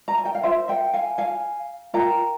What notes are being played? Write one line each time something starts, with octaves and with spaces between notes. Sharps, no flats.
A#5
G#5
G5
F5
F4 A#4 C5 E5
E5 G5
F5 G#5
F5 G#5
F4 A#4 G5 A#5